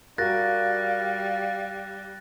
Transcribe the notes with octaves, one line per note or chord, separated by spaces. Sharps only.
G3 F#4 A#4 F5 F#6 A6 A#6